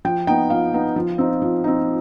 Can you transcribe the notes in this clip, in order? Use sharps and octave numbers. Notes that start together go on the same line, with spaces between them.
F3 G5
B3 D#4 G5
F3 F5
B3 D#4
F3
C4 D#4
F3
C4 D#4